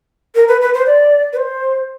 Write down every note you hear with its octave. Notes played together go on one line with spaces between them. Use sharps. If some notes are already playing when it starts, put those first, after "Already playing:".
A#4
B4
B4
C5
D5
B4
C5